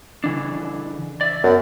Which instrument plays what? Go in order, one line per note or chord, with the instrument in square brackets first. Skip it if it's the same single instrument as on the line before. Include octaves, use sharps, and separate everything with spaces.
[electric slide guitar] C#3 E3 D4
D5 E5
[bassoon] F#2 [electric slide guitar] B3